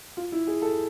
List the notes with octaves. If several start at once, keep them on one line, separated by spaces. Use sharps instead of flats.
F4
E4
G#4
A4